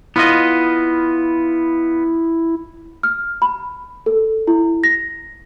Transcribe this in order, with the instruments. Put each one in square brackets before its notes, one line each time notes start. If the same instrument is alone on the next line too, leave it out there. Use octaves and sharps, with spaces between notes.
[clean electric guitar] B3 F4 D#5 [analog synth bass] E4
[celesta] F6
B5
A4
E4
A#6